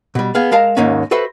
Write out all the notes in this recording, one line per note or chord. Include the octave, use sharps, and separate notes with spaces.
B2 G3
B3 G#4 F5
G#3 A#4 F5 A5 A#5
D#2 G#2 A#3 C#4
F#4 A4 B4 C5 E5